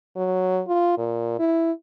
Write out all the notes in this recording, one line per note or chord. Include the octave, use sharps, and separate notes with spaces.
F#3
F4
A#2
E4